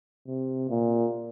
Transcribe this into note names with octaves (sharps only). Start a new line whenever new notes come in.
C3
A#2